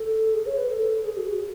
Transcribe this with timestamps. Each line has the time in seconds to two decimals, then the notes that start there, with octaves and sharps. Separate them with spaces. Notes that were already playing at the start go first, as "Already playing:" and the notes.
Already playing: A4
0.34 G#4
0.46 C#5
0.58 B4
0.69 A4
0.97 A4
1.05 G#4
1.17 F#4
1.28 G#4